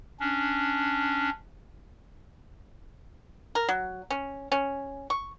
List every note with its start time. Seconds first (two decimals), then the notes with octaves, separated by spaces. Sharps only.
0.20 C#4 D4
3.55 A#4
3.69 F#3
4.11 C#4
4.52 C#4
5.10 C#6